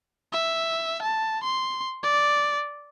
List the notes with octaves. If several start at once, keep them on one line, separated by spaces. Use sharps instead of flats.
E5
A5
C6
D5